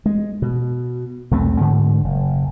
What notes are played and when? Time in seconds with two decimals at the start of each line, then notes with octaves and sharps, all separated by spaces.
0.06 G#3
0.42 B2
1.31 B1 E2 A3 C4
1.61 G#2 D3
2.04 F#1